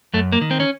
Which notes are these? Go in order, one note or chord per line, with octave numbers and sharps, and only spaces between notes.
F#2 A3
A#3
D#3
C4
C#4